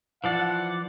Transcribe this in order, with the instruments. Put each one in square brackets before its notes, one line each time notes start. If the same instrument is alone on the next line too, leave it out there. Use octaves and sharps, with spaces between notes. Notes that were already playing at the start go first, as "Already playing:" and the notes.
[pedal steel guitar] E3 F3 D5 [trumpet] F#5